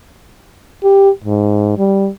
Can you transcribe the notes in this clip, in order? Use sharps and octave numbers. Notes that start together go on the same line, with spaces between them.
G4
G#2
G3